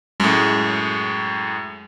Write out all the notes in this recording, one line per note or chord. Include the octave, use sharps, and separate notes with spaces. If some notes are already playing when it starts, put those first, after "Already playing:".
F#2 A2 G#3